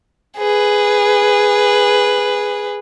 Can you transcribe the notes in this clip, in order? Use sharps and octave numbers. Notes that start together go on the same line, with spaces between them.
G#4 B4